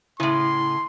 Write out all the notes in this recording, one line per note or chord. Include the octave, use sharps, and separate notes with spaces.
A2 C#3 E4 C6